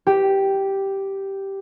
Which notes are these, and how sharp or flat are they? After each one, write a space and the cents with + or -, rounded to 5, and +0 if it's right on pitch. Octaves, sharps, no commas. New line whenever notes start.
G4 -5